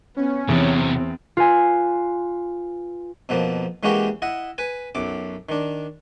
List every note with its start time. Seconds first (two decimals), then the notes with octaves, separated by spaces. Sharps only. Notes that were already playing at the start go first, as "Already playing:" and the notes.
0.17 B3 C#4
0.48 E2 C3 F#3 C4
1.37 F4 B4 G#5
3.29 F2 B2 F3 A#3
3.83 E3 G#3 A#3 C#4 F#4 G4
4.22 E4 D#5 F#5
4.58 B4 G#5
4.95 B1 F#2 D6
5.49 D#3 D4